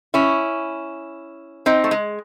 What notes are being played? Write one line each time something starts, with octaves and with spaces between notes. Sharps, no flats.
C#4 E4
C4 D#4
A3
G#3